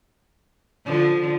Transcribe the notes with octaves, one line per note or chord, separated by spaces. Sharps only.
D3 F3